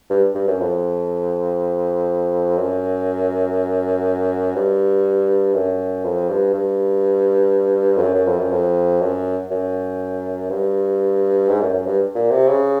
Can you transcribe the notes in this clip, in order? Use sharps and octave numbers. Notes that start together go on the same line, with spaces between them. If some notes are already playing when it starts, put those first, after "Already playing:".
G2
G2
F#2
F2
F#2
G2
F#2
F2
G2
G2
F2
F#2
F#2
F2
F#2
F2
F#2
F#2
G2
G#2
F#2
F#2
G2
A#2
C3
C#3